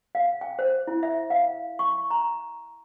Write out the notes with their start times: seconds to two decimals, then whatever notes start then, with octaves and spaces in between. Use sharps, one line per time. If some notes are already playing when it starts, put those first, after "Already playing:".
0.15 F5
0.41 G5
0.59 C5
0.87 E4
1.03 E5
1.30 F5
1.79 C#6
2.10 A#5